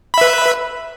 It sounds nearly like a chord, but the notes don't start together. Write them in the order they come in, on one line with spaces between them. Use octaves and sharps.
B5 E5 B4